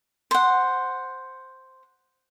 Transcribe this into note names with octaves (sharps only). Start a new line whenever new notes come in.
C5 F#5